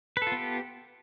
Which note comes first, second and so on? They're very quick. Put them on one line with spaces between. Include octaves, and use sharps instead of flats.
B4 A4 F4 B3 G4